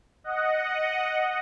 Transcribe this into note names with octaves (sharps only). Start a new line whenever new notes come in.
D#5 F#5